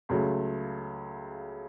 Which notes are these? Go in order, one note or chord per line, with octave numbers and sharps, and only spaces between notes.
C#2 C#3 F#3 A3